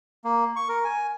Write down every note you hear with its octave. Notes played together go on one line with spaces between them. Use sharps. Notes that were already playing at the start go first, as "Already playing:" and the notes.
A#3
C#6
A#4
G#5